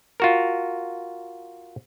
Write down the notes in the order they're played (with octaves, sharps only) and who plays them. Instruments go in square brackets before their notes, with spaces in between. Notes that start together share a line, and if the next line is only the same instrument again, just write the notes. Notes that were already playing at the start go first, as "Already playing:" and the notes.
[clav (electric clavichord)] F4 F#4 A#4